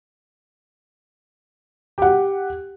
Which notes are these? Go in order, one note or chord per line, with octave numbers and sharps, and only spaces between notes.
G4 F#5